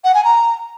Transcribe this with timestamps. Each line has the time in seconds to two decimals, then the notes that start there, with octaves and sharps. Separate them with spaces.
0.04 F#5
0.14 G#5
0.25 A#5